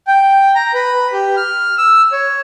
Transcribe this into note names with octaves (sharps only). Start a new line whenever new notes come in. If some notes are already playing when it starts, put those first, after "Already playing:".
G5
A#5
B4
G4
F6
E6
C#5